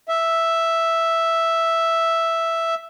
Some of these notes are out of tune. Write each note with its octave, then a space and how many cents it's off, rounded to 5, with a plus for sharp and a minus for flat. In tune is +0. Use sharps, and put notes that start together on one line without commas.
E5 +0